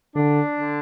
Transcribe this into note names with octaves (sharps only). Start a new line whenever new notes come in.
D3 D4
D3